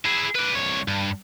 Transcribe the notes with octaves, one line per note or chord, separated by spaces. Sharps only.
E4 G#4
B4 D5
C2 C#5
G2